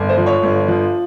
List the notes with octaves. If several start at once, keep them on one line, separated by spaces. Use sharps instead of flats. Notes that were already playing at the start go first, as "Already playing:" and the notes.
Already playing: G1
C5
F3
C#5
G1
F3